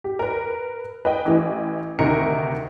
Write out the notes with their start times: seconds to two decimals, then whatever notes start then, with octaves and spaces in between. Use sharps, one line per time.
0.04 G4
0.19 A#4 B4
1.05 B4 D#5 G5
1.25 A1 E3
1.99 D2 C3 D#3 D#4 A#4 C#7